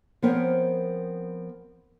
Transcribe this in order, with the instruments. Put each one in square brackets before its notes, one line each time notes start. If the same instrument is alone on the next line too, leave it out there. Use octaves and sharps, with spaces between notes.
[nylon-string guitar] F3 B3 C4 A#4 C#5